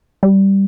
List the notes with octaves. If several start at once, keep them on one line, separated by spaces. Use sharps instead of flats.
G3